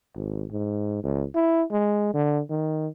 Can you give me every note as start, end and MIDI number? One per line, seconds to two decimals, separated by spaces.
0.14 0.45 32
0.51 0.98 44
1.03 1.25 37
1.35 1.62 64
1.71 2.11 56
2.14 2.40 50
2.50 2.87 51